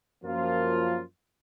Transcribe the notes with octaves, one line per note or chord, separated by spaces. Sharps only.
F#2 F3 A#3 F4